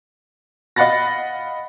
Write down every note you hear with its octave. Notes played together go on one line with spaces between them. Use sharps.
D#5 F5 F#5 B5 A6 A#6